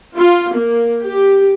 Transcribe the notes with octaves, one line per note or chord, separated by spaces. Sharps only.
F4
A#3
G4